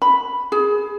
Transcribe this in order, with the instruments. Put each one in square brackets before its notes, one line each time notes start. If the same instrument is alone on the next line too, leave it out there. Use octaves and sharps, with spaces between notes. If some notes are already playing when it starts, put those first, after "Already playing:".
[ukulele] B5
G#4